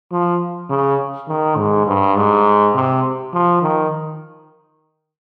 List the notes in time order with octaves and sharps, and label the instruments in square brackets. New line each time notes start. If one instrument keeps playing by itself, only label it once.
[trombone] F3
C#3
D#3
G#2
G2
G#2
C3
F3
D#3